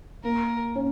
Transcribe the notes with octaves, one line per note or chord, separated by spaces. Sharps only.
A#3 A#4
C#4